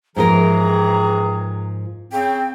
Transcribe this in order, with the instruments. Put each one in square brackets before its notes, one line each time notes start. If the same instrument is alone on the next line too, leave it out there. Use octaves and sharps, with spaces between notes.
[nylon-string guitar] G#2 F3 A#4 [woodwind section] C3 E3 G#4 [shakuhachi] A#5
[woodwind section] C#3 C4 [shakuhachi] G5